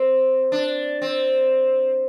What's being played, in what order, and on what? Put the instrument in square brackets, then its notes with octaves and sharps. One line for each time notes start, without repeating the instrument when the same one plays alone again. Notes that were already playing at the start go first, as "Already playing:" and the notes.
Already playing: [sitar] C4
D4
C4